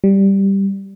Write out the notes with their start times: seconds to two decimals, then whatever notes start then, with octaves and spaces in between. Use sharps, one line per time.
0.04 G3